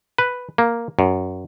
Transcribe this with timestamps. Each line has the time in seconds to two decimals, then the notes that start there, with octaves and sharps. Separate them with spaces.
0.18 B4
0.58 A#3
0.99 F#2